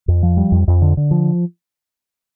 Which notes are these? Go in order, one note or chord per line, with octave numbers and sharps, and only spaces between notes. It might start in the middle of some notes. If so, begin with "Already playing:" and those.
F2
F3
G3
F2
F2
D3
D3
F3